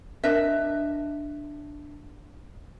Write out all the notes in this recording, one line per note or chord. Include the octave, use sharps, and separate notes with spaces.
D4 A#4 D#5 E5